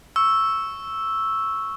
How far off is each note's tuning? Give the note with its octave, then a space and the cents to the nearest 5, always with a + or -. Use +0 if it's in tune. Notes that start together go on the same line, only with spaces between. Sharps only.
C#6 +0 E6 +0